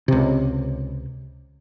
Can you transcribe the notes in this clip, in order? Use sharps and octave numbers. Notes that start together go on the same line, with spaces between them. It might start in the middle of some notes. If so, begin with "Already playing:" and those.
C#2 C3